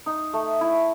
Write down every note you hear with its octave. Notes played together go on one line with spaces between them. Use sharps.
D#4
A3
E4